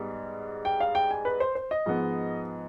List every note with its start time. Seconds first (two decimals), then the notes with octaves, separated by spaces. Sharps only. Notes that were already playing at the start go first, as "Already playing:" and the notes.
Already playing: G#2 G3 B3
0.65 G5
0.80 F5
0.95 G5
1.11 G#5
1.25 B4
1.40 C5
1.55 C5
1.71 D#5
1.86 G#2 F3 B3